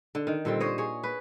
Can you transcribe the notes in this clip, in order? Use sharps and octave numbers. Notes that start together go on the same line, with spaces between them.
D3
D#3
A#2 D3 G3 C4
C5 C#5 D#5
G#4 C#5
B4